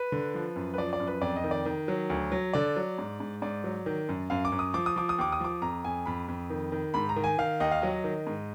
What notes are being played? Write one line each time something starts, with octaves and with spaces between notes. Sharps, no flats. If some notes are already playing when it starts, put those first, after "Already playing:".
Already playing: B4
D3
F3
F#2
B4
F3 D5
D5
F#2
B4
F2 D5
D#5
D#3
D5
D#3
F#3
D2
F#3
D3 D5
F#3
G#2
G#2
G#2 D5
F#3
D#3
F#2
F#2 F5
D6
F#2
D#6
F3 D6
D#6
F3 D6
D#6
D#2 D6
D#6
F3 D6
F2 A#5
F2 G#5
F2 B5
F2
D#3
D#3
G#2 B5
A#5
D#3
G#5
D#3 F5
D#2 D#5
F5
F#3 D#5
D#3
G#2